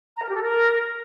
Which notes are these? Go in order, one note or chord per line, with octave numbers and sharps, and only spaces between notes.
A#5
A#4
G4
A4
A#4